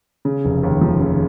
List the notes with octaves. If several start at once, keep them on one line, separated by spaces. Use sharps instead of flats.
C#3
F1
D#2
F3
C#3